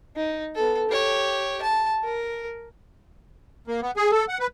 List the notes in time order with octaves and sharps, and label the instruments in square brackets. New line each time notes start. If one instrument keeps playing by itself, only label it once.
[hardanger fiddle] D#4
B3 A4
G4 C#5
A5
A#4
[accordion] A#3
B3
G#4
A4
F#5
B4